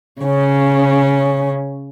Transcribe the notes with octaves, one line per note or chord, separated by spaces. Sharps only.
C#3 C#4